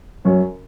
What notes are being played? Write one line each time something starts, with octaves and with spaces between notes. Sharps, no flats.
F#2 C#4